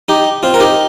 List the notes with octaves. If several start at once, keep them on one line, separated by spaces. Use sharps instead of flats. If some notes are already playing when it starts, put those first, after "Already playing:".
D#4 G4
C4 F4
A#4
D#4 G4